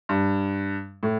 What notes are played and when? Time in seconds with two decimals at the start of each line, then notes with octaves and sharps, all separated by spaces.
0.09 G2
1.03 A2